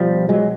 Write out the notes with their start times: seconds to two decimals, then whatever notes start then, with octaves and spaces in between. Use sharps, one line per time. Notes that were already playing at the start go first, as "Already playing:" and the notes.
Already playing: B1 B2 F3 G3
0.29 F#3 G#3